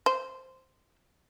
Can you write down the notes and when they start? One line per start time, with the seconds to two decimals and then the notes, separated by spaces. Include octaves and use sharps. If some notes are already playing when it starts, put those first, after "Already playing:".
0.06 C5